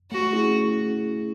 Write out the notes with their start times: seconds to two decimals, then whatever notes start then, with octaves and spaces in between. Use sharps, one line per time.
0.11 A3 F#4
0.33 C#4 E4 G#4